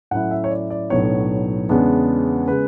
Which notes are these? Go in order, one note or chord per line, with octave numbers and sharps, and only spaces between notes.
A2 F#3 C#4 E4 F#5
E5
C#5
D5
D5
B1 A2 F#3 B3 D4 C#5
E2 C#3 G#3 B3 D4
C#3 G#3 B3 B4